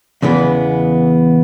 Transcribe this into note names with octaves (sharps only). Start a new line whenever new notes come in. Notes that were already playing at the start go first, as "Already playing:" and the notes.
E2 C#3 E3 G#3 B3